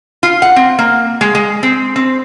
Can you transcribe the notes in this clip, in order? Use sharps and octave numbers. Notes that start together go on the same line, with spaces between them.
F4
F#5
C4
A#3
G#3
G#3
C4
C4